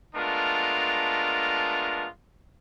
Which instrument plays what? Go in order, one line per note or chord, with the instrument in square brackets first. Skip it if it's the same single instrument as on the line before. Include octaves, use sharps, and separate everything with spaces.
[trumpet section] G#3 A3 B3 D4 F4 A#4